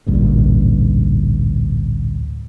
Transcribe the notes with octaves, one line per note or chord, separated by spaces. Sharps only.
A1 D2 G2 A#2